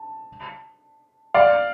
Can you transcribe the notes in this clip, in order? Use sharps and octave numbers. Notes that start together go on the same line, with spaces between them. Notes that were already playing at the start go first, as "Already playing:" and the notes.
Already playing: A5
D5 F5